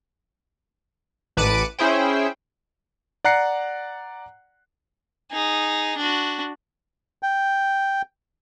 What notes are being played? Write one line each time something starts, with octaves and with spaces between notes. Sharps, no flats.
A1 B4 A5 D6 C#7 D#7
C#4 E4 G#4 C5 G5
D5 F#5 A#5 F#6 C7 C#7
D#4 G#4
D4 F#4
G5